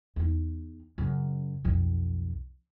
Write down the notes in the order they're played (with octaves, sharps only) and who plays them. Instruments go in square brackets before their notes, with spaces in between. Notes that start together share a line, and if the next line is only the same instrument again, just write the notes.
[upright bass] E2 D#4
F#2 C#3
B1 F2